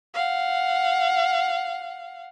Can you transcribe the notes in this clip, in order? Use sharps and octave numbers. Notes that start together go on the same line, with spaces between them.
F5 F#5